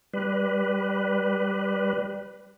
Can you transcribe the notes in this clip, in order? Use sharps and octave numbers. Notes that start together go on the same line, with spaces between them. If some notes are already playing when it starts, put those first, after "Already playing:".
G3 B4